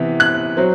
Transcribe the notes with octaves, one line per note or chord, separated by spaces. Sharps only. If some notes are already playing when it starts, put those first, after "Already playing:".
Already playing: C3 E3 B3
F#6
F#3 C4